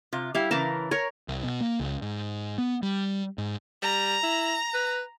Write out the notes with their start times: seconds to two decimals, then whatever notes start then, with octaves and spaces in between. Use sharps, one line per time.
0.13 C3 F4
0.35 G3 E4 G4 F5
0.51 C#3 E3 A#4 A5
0.91 A#4 C#5
1.28 C2
1.43 B2
1.61 A#3
1.80 C#2
2.02 G#2
2.58 B3
2.83 G3
3.38 G#2
3.82 G3 A#5
4.23 E4
4.74 B4